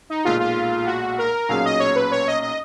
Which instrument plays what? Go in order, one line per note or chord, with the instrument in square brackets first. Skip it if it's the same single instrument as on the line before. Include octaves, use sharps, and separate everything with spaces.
[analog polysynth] D#4
[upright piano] B1 A#2 G#3 [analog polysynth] F4
[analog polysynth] F4
F#4
A#4
[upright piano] B1 A#2 F#3 C#4 G#4 [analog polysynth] F5
[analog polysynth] D#5
C#5
B4
C#5
D#5
D#5